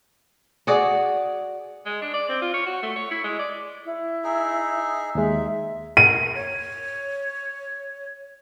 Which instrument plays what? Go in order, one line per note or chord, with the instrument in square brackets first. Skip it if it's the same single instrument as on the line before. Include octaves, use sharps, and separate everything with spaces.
[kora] F#4 G#4 D5
[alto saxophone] G#3
D4
D5
C4
F4
C#5
F#4
A3
C#5
E4
G#3
D5
[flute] E4
[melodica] D#4 G#4 E5
[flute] D#6
[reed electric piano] D#2 G#3 [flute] E5
[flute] A#4 [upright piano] D#7
[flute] C#5